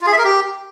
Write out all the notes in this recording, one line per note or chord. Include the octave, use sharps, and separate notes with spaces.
F4
G#4
E5
A#4
G4